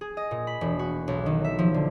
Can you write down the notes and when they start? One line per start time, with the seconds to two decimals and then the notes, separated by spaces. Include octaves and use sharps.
0.01 G#4
0.17 D#5
0.31 A#2
0.47 B5
0.61 E1
0.79 F#4
1.08 B1
1.26 D#3
1.44 E5
1.59 F3
1.74 D3